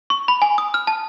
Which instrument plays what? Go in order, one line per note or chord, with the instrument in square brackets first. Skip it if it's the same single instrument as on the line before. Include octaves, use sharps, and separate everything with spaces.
[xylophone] C#6
B5
G#5
D#6
F6
A5